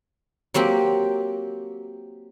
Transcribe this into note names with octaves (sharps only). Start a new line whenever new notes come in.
F#3 A#3 C4 G4